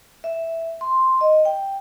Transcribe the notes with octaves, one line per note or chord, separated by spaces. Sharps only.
E5
C6
D#5
G5